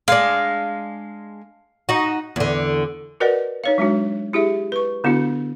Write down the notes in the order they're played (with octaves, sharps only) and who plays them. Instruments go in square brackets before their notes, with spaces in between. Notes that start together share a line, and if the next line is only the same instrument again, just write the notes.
[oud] G#3 D4 [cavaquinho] F5
[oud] D#4 F#4
E2 D3
[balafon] F#4 A#4 B4 D5 D#5 F#5
D#4 C#5 F5
F#3 G#3 D4 F#4
E4 G4 G#4 E5
B4 C#6
D3 B3 D4 E4 F#4